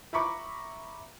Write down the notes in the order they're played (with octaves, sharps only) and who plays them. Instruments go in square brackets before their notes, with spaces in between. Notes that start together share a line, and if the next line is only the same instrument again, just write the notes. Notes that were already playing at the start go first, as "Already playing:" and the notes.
[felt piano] E5 A#5 B5 C#6 D6